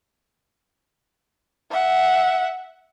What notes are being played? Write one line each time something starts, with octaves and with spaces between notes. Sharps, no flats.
E5 F#5